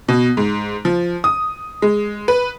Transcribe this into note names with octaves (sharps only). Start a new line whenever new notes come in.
B2
G#2
F3
D#6
G#3
B4